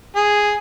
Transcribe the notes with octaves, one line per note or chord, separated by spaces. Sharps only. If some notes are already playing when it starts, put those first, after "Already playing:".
G#4